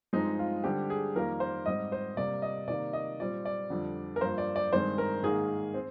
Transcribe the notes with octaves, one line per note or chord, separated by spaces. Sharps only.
G2 F3 G#3 C4 D#4
F4
D3 G3 C4 G4
G#4
F2 D#3 G3 A#3 A#4
C5
G#2 G3 C4 D#5
C5
C3 G3 A#3 D5
D#5
C3 D#3 A#3 D5
D#5
A#2 G3 C4 D5
D5
F2 D3 G3
A#4
G2 F3 A#3 C5
D5
D5
G2 D#3 G#3 C4 C5
A#4
G#2 D#3 A#3 G#4
C4